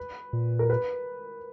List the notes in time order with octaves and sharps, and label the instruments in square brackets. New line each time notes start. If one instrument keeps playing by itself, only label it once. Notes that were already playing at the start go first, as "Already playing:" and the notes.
Already playing: [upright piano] B4
[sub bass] A#2
[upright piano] A#4
B4